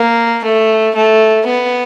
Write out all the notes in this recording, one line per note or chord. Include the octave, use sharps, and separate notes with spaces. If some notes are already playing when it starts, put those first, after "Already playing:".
Already playing: A#3
A3
A3
B3